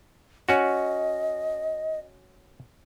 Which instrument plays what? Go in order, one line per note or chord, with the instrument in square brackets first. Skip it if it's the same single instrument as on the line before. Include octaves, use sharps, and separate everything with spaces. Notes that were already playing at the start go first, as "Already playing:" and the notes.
[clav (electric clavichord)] C#4 F#4 [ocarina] D#5